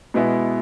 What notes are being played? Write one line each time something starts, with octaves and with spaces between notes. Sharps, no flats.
B2 G#3 B3 E4